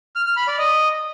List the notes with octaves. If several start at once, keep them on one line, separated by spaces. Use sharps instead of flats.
F6
F6
B5
D5
D#5